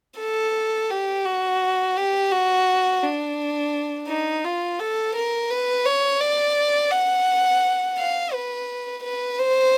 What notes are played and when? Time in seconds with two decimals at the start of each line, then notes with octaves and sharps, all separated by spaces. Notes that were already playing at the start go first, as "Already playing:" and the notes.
0.19 A4
0.91 G4
1.25 F#4
1.96 G4
2.32 F#4
3.02 D4
4.08 D#4
4.45 F4
4.80 A4
5.15 A#4
5.50 B4
5.86 C#5
6.20 D5
6.92 F#5
7.98 F5
8.33 B4
9.03 B4
9.39 C5